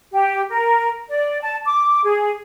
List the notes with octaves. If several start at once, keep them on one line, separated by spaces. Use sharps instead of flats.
G4
A#4
D5
A5
D6
G#4